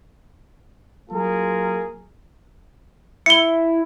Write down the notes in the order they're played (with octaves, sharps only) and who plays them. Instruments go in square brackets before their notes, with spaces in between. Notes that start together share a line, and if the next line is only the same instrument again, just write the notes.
[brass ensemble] F#3 A#3 F4 G#4 A#4
[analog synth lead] E4 [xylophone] C#7 G7